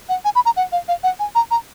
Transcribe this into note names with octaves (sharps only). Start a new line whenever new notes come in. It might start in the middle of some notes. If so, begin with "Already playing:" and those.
F#5
G#5
B5
A#5
F#5
F5
F5
F#5
G#5
A#5
A#5